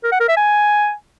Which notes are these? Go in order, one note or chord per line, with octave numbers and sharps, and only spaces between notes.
A#4
F#5
A#4
E5
G#5